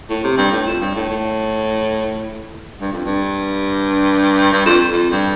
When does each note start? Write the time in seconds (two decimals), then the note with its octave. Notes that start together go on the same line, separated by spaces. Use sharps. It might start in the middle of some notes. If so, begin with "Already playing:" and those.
0.09 A2
0.24 C3
0.38 G2
0.52 A2
0.66 F2
0.81 G2
0.95 A2
1.09 A2
2.81 G2
2.92 F2
3.05 G2
4.53 G2
4.66 F2
4.91 F2
5.10 G2